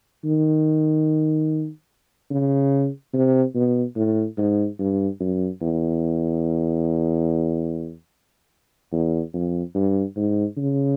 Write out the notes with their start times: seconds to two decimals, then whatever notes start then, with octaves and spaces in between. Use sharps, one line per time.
0.25 D#3
2.31 C#3
3.14 C3
3.55 B2
3.96 A2
4.38 G#2
4.79 G2
5.20 F#2
5.62 E2
8.92 E2
9.33 F2
9.74 G2
10.16 G#2
10.57 C#3